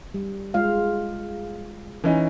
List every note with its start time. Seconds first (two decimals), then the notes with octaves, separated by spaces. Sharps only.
0.14 G3
0.54 G#3 F4 F5
2.04 E3 C#4 D#4